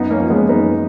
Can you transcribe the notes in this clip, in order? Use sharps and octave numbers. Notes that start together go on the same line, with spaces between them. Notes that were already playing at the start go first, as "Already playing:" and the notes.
Already playing: F#2 B3 D#4
A#3 C#4
F3
G#3 B3
F#2 B3 D#4